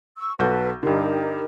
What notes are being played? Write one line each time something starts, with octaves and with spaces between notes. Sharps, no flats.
C#6 E6
B1 F#4 A4 B4 A5 G6
G2 D3 D#4 G4 A#4